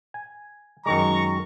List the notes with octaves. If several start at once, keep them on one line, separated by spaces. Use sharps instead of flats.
G#5
F#2 D#3 G#3 A#5 C#6